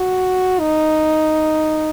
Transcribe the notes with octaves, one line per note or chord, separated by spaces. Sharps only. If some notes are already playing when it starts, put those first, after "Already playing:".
Already playing: F#4
D#4